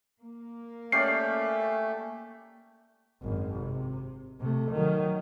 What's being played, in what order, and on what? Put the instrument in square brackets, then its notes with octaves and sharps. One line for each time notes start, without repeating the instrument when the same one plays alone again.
[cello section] A#3
[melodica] A3 [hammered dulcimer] C#4 G4 D5 [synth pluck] C7
[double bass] G#1 F#2
C3
C3 A3
D#3 F#3